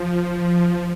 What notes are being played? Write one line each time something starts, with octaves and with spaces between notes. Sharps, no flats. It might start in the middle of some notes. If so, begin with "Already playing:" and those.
Already playing: F3